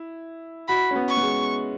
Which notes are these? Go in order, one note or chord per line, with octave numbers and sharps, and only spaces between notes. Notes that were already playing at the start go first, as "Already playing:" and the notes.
Already playing: E4
F#4 B5
C#4
B3
C#6
B3
G#3